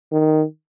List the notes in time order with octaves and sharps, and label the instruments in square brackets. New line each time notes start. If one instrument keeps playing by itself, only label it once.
[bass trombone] D#3